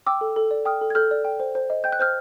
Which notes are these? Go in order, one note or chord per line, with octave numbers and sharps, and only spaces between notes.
G5 D6 E6
A4
A4
D5
G5 D#6 F6
A4
G#6
A4 F6 G6
D5
G5
C5
C5
D#5
G5 G6
F#6
C5 F6 G6